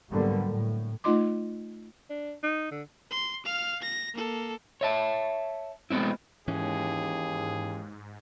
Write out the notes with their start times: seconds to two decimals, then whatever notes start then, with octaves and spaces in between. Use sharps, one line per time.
0.11 G#2 D3 F#3 G3 A#3 B3
0.47 A2
1.04 A3 D#4 F4 D#5 C6 D6
2.10 D4
2.43 D#4
2.71 D3
3.11 C6
3.45 F5 F6
3.82 A#6
4.14 A#3 A4
4.81 C#5 E5 A5
5.90 G#3 A3 B3 C4 E4
6.48 D#2 G#2 E3 C#4 G#4